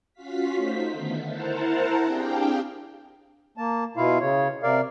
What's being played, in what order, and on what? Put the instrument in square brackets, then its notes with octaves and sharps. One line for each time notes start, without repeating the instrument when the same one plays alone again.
[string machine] C#4 F4 F#4 F5 B6
A3 D#4 C5 B6
D3 D#3 A3 B3
E4 A#4 C5 F#5 A5 A#5
C4 D4 G4 G#4 F5 G5
[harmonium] A#3 A5
B2 E4 F4 F5
C#3 C#5
C3 A#4 D5 F5